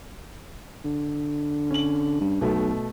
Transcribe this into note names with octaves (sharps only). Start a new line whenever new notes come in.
D3
C#4 F#7
G2
B1 B2 A3